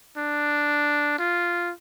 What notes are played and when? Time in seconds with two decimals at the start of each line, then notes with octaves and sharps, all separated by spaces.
0.18 D4
1.19 F4